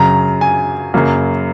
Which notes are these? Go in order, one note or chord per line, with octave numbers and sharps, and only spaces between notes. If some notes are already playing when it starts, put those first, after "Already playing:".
Already playing: F#2 C#3 F#3 A#5
G#5
F#2 C#3 F#3 A#3